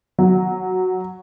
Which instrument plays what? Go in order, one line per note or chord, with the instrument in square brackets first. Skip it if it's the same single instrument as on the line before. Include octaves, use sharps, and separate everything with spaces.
[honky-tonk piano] F#3